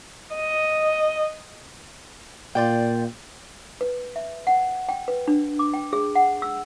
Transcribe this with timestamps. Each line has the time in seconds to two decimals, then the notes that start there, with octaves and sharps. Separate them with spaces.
0.35 D#5
2.55 A#2 F4 D5 G5
3.81 B4
4.16 E5
4.47 F#5
4.89 G5
5.08 B4
5.28 D4
5.59 D6
5.74 G5
5.93 G#4
6.15 F#5
6.42 E6